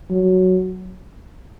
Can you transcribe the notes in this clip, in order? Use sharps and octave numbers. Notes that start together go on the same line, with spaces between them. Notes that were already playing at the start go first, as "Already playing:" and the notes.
F#3